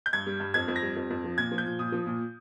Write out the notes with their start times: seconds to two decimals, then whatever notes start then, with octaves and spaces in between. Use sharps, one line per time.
0.06 G6
0.13 G2 G#6
0.27 G3
0.40 G2
0.54 F2 G#6
0.68 F2
0.76 A#6
0.83 G3
0.96 F2
1.10 F2
1.24 F3
1.38 A#2 G#6
1.52 F3
1.58 G6
1.66 A#2
1.79 A#2 D#6
1.92 F3
2.06 A#2